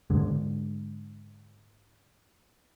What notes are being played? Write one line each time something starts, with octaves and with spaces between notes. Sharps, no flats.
G#2 D3 G#3